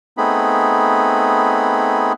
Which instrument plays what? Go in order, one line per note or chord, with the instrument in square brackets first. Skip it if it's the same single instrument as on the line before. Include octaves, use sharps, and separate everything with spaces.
[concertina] A3 B3 C4 D#4 G#4 B5